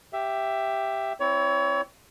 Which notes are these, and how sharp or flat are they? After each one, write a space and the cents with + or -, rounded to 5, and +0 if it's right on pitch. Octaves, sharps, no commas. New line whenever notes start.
G4 +0 E5 +10
C4 +0 E4 +0 C#5 +30